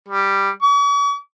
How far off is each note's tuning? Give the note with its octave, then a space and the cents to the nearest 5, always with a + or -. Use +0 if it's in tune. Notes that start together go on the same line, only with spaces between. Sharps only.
G3 +5
C#6 +45